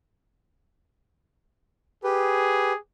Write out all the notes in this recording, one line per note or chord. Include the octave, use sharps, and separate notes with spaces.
G4 G#4 B4